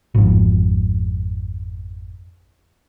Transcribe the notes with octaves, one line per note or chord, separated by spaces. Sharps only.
G#1 F2